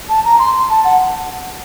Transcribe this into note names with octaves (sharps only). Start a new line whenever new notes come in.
A5
A#5
C6
A5
F#5